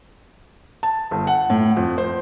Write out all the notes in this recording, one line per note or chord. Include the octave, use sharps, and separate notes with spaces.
A5
G1
F#5
A2
F2
C5